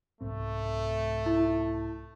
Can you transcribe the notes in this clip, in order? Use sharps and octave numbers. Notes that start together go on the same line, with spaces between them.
C2 G#2 A3 C4
E4